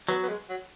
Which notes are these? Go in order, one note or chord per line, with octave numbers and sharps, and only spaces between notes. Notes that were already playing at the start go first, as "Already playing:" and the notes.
F#3 B3
B3
G#3
F#3